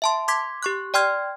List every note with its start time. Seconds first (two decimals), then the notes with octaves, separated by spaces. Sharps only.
0.02 E5 A5 C6
0.28 C6 D6 G#6 B6
0.63 G4 C#6 F#6
0.94 D5 G5 C6 F6 G#6